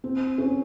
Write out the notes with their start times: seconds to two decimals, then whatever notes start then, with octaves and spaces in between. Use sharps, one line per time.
0.04 C4
0.38 C#4